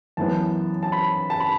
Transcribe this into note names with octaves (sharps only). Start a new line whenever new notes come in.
F#2 E3 B3 A5
A5
B5
A5
B5